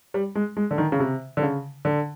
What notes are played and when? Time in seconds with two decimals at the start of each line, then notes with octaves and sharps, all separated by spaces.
0.14 G3
0.35 G#3
0.57 G#3
0.71 D3
0.78 D#3
0.92 C#3
0.99 C3
1.37 D3
1.42 C#3
1.85 D3